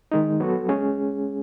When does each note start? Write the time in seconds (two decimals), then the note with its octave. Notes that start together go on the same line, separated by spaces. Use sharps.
0.12 D#3 G#3 D#4
0.40 F#3 B3 F#4 A4
0.69 G#3 C#4 G#4